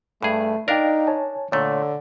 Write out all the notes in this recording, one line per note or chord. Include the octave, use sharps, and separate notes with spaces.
G2 A3 G#4
D4 D#4 A#4 D5 F5 G5
C#5 G#5 A5
A#2 D3 A3 C#5